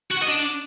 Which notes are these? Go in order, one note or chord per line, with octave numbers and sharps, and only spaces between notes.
F#4
F#5
D#5
D4